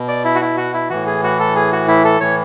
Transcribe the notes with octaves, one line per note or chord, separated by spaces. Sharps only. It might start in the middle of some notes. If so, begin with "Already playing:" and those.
Already playing: B2
D5
E4
F#4
E4
F#4
E4
A2 E3 F#4
G#4
F#4
A4
G#4
F#4
E4
A4
A2 E3 C#5